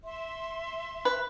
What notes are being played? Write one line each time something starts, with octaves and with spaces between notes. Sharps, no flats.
E5 C6
B4